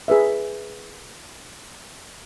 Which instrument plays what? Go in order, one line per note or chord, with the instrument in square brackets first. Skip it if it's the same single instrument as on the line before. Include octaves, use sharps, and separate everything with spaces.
[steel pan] G#4 B4 E5